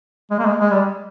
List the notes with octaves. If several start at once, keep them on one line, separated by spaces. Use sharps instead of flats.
G#3
A#3
G#3
G#3
G3